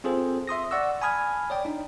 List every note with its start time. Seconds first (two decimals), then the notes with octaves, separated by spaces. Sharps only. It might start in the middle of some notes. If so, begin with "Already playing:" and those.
0.04 C4 F4 G#4 A4 C5
0.47 E5 C6 D#6 A#6
0.71 D5 F#5 C#6 E6
1.02 G#5 A5 B5 D#6 F6 G#6
1.50 C#5 D5 G5
1.65 D4 D#4